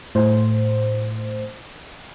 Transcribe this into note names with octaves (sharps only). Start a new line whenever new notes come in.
A2 C5